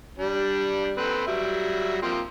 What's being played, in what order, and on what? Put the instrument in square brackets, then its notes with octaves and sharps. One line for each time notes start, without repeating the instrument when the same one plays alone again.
[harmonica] G3 D4
C4 A4 B4
F#3 G3 E5
F3 A#3 C4